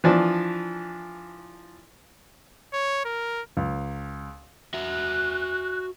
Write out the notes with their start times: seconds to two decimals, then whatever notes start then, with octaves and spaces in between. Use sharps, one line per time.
0.04 E3 F3 D4
2.73 C#5
3.05 A#4
3.57 C#2
4.74 F#4 E5 F#6